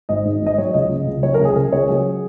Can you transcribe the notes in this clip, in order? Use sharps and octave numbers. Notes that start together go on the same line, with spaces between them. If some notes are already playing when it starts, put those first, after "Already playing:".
G#1 D#5
G#2
G#1 D#5
F#3 C#5
C#2 D#5
C#3
C#2
F#3 C#5
A#4
C#2
G#4
C#3 A#4
C#2 C#5
F#3 G#4